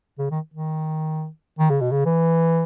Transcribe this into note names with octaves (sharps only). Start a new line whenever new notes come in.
C#3
D#3
D#3
D#3
C#3
B2
C#3
E3